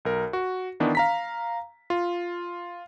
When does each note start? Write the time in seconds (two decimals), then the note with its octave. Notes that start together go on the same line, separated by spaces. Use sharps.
0.05 B1 A#4
0.33 F#4
0.80 D#3 E3 B3 D4
0.95 F5 A#5 B6
1.90 F4